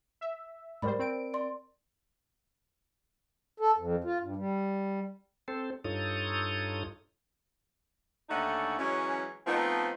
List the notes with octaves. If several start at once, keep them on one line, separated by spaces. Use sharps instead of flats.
E5
G#2 G3 A#4 C5 D5 B5
C4 D7
D5 C6
A4
F2
F4
G2
G3
C4 A4 C5
G2 D#4 F4 A4 C#5 D#6
D#2 D3 A3 C#4 D#4 F#5
E3 F#3 G#3 C#4
F3 A3 B3 C4 D#4 F4